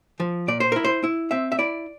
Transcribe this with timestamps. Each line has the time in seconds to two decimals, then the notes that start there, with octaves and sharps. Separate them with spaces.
0.20 F3
0.48 A#2 D5
0.60 C5
0.72 E4 A#4
0.84 C5
1.04 E4
1.31 C4 E5
1.52 E5
1.59 E4 D5